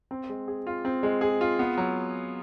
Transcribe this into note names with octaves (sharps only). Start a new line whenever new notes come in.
C4
G#3
G#4
F4
C4
G#3
G#4
F4
B3
F#3